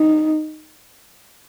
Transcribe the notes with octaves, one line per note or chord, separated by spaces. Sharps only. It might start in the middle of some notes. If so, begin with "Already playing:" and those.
Already playing: D#4